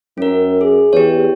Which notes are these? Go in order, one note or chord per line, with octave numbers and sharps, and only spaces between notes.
F#2 C#4 A#4
G#4
E2 G4 C#5